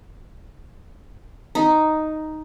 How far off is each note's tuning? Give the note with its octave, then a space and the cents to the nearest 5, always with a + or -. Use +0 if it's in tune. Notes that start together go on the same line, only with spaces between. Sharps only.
D#4 +0